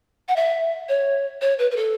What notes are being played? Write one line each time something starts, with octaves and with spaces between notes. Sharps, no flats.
F#5
E5
C#5
C#5
B4
B4
A4